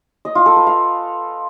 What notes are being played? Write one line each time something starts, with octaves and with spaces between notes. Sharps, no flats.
D#5
F4
A4
B4
F5